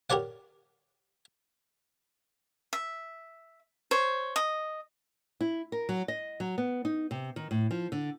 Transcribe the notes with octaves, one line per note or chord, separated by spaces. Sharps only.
G4 A#4 C#5 D5 F#5
E5
C5 C#5
D#5
E4
A#4
F#3
D#5
F#3
B3
D#4
C3
D#3
A2
F3
D3